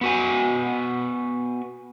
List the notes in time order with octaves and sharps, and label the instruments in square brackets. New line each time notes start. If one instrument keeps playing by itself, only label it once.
[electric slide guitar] B3 F#4 G#5